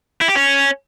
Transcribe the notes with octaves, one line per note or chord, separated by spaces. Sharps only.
E4
G4
C#4